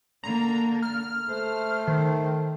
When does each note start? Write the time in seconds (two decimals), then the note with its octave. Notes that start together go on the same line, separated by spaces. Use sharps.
0.24 D3 A#3 A#5
0.83 F6
1.29 A3 C5
1.87 D#3